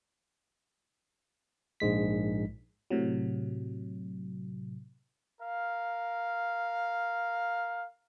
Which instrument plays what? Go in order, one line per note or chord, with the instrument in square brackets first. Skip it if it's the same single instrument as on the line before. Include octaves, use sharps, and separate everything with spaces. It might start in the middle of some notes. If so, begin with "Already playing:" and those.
[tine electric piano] A#1 G#2 G#3 B6
[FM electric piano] A2 C3 F#3
[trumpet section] A#4 F5